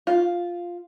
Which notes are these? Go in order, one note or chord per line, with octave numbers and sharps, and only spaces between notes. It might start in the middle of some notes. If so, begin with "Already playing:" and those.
F4